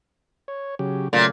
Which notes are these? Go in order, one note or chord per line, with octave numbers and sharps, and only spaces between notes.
C#5
C#3 F#3 G4
A#2 C#3 F#3 A3